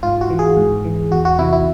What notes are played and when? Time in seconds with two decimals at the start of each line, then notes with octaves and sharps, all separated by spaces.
0.03 G#2 F4
0.21 F#4
0.30 E3
0.39 G#4
0.57 G#2
0.84 E3
1.11 E2 F#4
1.25 F#4
1.38 C3 E3 E4
1.53 E4